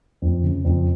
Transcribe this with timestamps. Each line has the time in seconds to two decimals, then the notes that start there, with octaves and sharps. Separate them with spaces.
0.22 F2
0.43 C#3
0.65 F2